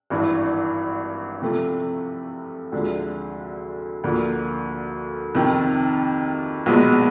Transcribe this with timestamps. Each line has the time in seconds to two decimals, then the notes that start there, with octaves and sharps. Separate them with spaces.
0.10 G#1 G2 E3
1.42 C3 F3 A3
2.72 D2 D3 F3 G#3
4.04 D2 D3 F3 A#3
5.35 F2 C3 D#3
6.66 B1 A#2 F3 G#3 B3